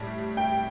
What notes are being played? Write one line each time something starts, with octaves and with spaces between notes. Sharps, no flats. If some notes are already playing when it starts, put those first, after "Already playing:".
Already playing: A2 G3
G5